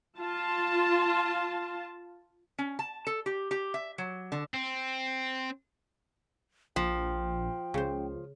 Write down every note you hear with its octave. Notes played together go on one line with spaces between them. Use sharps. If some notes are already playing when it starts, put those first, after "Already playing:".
F4 A5
C#4
A5
A4
G4
G4
E5
F#3
D3
C4
A#1 F3 G5
C#2 C#3 C5